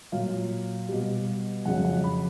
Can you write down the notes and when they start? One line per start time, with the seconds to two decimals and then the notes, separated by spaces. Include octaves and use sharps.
0.12 A#2 F#3 F5
0.89 B2 G3
1.65 F2 C#3 F#3 F#5
1.85 F#5
2.04 B5